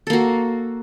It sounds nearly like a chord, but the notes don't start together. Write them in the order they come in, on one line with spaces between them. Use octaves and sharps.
A4 A#3 F#4